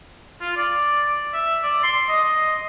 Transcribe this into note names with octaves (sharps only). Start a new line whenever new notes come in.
F4
D5
E5
D5
C6
D#5
D#5